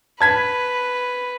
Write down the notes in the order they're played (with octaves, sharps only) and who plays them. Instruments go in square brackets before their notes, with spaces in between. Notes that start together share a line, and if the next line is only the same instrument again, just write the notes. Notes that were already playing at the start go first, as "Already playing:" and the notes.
[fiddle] B4 [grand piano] A5 G#6 B6